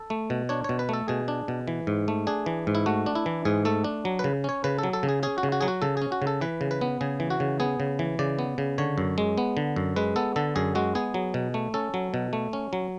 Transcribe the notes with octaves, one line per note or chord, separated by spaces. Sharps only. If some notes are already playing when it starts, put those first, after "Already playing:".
Already playing: A4
A3
B2
D4 C#5
B2 C#5
B4
A3 A4
B2 G#4
D4
B2
E3
G#2
A3
D4 G#4
E3
G#2
E4
A3 F#4
D4
E4
E3
G#2 G#4
A3 A4
D4
F#3
B4
C#3
C#4 C#5
C#3 B4
F#3 A4
A4
C#3
G#4
C#4 G#4
F#4
C#3
F#4
F#3 G#4
F#4
C#3 A4
C#4 G#4
F#4
C#3
A4
E3 B4
C#3
B4
B3
C#3 G#4
E3
F#4
C#3
B3 G#4
C#3
E3
C#3 D5
B3
C#3
D3 C#5
F#2
G#3
B3
D3
F#2
G#3 B4
B3 A4
D3 A4
F#2 G#4
G#3 F#4
B3 G#4
F#3
B2
A3
C#4 A4
F#3
B2
A3
C#4
F#3